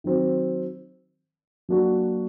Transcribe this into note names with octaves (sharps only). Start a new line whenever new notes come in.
D#3 F#3 C4
F#3 A#3 D4 F#4